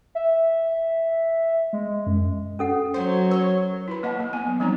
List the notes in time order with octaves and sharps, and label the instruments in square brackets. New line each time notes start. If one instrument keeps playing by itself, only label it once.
[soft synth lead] E5
G#3
F#2
[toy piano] C#4 A4 F#5
[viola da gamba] F#3 [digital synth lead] C5
[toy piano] A#4 [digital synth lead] C#5
[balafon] E4 B4 B5
A#3 D#5 F#5 A5
A#3
B3 G#5
F#3
F3 G3 C4 D#4 D5 A#5